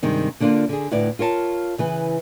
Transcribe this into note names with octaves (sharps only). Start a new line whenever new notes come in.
G2 C3 D#3 G#3
D3 A#3 D4 D#4 F4
D3 G#4
D2 A2 E4 B4 D5
F4 A#4 C#5 A5
C#3 E3 B4